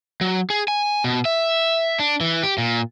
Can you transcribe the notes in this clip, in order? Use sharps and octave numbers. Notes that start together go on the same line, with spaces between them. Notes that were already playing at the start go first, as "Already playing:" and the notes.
F#3
G#4
G#5
B2
E5
D4
E3
G4
A#2